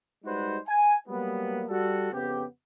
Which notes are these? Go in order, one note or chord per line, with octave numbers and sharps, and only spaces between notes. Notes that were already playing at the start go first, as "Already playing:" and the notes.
G3 G#3 D#4 F#4 B4 C5
G#5
F#3 G3 A#3 B3
G3 F#4 A4
F2 C#3 B3 G4